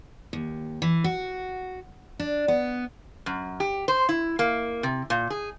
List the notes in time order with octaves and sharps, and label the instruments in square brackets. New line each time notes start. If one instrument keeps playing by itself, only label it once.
[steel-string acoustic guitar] D#2
E3
F#4
D4
B3
[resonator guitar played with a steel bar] F#2
G4
C5
E4
A#3
C3
A#2
G#4